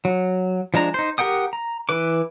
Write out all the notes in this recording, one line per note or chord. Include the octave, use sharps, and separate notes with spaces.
F#3
F3 G#3 D4 A#5
D#4 C5
G4 A#4 F#5 G5 D#6
A#5
E3 B4 D6